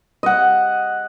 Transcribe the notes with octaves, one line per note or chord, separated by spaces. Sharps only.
D#5 F#5